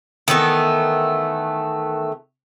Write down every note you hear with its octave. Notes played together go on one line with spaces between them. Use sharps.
D#3 E3 A3 B3